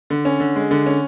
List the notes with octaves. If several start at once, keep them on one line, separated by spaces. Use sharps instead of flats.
D3
C#4
D3
G#3
D3
C#4